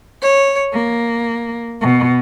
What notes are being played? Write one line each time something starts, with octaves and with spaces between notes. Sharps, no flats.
C#5
A#3
B2